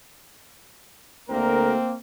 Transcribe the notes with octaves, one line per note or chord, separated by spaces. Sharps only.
D2 A#3 C4 A#4